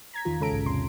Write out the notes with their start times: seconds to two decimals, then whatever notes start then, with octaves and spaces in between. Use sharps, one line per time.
0.13 A#5 G#6 B6
0.25 E2 D#3 F4
0.40 C#3 G#3 C#4 A4 A#5 D7
0.52 B1 G#2
0.66 E2 C3 C6